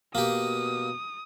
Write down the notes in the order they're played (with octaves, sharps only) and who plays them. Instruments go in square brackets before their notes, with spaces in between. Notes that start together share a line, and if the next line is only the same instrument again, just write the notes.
[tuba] B2 [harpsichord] A#3 G4 [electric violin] D#6